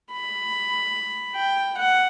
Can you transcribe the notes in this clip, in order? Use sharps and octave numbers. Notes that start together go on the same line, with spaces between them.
B5
G5
F#5